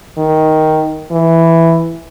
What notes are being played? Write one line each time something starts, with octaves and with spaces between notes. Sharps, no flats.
D#3
E3